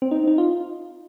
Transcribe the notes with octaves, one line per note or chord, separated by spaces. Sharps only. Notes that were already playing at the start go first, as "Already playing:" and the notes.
C4
D#4
D#4
F4